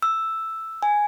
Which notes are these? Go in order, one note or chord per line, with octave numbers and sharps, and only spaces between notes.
E6
G#5